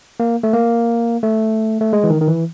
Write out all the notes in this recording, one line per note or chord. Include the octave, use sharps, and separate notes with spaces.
A#3
A3
A#3
A3
A3
G#3
E3
D#3
D#3
E3